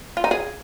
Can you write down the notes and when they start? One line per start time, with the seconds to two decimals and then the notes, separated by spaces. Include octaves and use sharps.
0.17 F4
0.24 D#4
0.31 G#4